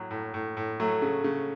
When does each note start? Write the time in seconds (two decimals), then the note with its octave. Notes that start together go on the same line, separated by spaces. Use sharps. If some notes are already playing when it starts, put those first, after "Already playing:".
Already playing: A2 F#3
0.11 A2
0.34 A2
0.57 A2
0.80 F#3 A3
1.02 C#3
1.24 C#3